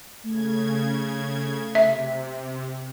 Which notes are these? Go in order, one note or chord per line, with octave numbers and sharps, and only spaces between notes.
C#3 A3 G#6
C3 E5